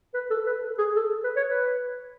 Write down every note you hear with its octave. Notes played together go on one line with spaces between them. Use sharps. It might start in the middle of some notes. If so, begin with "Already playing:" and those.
B4
A4
B4
A4
G#4
A4
B4
C#5
B4